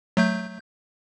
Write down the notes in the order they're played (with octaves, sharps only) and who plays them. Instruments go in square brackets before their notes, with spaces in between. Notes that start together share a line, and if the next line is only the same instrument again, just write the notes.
[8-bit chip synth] F#3 A3 G6